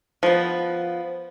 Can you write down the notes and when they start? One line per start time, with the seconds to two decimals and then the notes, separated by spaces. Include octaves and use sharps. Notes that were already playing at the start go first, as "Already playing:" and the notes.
0.23 F3 B3